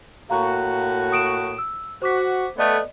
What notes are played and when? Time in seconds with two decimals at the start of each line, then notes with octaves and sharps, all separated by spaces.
0.30 A2 A#3 F#4 F5 A#5
1.12 D#6 D7 E7
1.58 E6
2.02 F#4 C5 D6 B6
2.58 A3 B3 D5 D#5